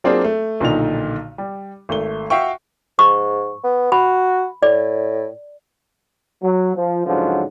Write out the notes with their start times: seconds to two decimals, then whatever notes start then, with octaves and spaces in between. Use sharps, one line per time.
0.04 F#3 A#3 C4 D4 F4 G#4
0.24 A3
0.60 B1 A#2 D3 D#3 D#4 F7
1.38 G3
1.89 G#1 A3 G7
2.30 F#4 E5 F5 G5 C#6
2.99 G#2 C#6
3.64 B3
3.92 F#4 B5
4.63 A2 D5
6.42 F#3
6.76 F3
7.06 C#2 G#2 D3 F3 F#3